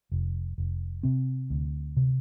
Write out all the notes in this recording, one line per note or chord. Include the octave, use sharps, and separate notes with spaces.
F1
F1
C3 C4
D2
C3